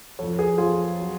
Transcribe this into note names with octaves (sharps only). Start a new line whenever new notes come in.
F2 F3 A4 C#5
G#4 B4
F2 F3 F4 G#4
F#3